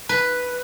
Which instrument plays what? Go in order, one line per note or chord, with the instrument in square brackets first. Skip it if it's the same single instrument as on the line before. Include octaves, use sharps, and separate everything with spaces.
[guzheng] B4